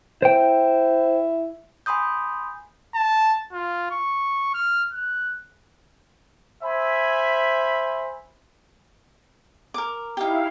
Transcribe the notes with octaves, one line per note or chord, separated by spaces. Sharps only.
E4 C5 G5
G#5 B5 C6 D#6 G6
A5
F4
C#6
F6
F#6
C5 E5 G#5 B5
A#4 D6
D#4 E4 G4 F5